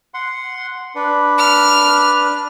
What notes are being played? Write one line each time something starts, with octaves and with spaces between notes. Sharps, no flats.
F#5 C6
D4 B4
F6